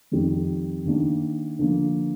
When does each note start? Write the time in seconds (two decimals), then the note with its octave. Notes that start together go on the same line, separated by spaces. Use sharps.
0.12 F2 D#3 G3
0.85 D#3 A#3 D4
1.59 D3 F3 A#3